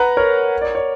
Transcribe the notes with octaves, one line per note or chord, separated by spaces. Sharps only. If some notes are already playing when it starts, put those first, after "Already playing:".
Already playing: B4 F#5 A#5
A#4 C#5
D5
C#5